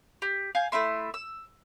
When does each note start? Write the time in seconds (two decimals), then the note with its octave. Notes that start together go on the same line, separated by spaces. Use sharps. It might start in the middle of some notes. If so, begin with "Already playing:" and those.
0.22 G4
0.55 F5 G#5 G6
0.72 A3 E4 E5 C6
1.14 E6